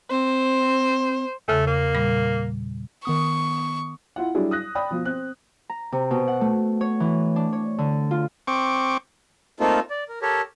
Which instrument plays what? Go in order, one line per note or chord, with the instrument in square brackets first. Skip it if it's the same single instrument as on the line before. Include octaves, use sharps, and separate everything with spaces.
[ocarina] C4 [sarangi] C5
[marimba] E2 C#3 [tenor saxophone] A3
[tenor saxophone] A#3
[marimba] A#2 G3 B5
[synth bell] D#3 B3 D#6 [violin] C#6
[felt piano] E4 F4 F#5
F#3 G3 D4 E4 G#4
D#6 F#6 A#6
D5 G5 B5 D#6
B2 F3
C4 F#6
[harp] A#5
C3
B2
F#5
A3
C#5
E3
D4
C#5
D3
F4
[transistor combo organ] C4 C#6 D6
[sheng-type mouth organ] A3 A#3 C4 D#4 F4 A4
D5
A#4
G4 A4 A#4 C#5